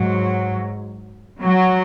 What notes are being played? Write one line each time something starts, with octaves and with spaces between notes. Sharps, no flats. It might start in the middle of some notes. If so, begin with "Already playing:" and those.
Already playing: G#2 F#3
F#3